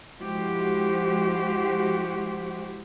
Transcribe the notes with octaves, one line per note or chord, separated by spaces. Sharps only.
F3 G#3 E4 F#4 G4 C5